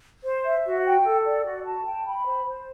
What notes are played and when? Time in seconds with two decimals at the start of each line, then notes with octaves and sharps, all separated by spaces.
0.24 C5
0.45 E5
0.65 F#4
0.85 G5
1.05 A4
1.25 D5
1.45 F#4
1.66 A5
1.85 G5
2.06 B5
2.26 C5
2.46 C5